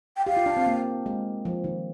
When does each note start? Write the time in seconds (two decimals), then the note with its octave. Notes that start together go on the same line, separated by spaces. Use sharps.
0.17 G5
0.27 G4 F5
0.37 F4
0.46 D4
0.57 C4
0.66 A#3
1.06 G#3
1.45 F3
1.64 D#3